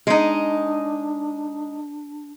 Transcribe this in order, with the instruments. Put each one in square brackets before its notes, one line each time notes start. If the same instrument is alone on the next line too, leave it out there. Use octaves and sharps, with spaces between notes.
[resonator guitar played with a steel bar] G#3 D#4 [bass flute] D4